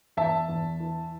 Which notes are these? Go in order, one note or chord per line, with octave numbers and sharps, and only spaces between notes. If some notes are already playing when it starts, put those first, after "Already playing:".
E2 E5 A5
E2
E3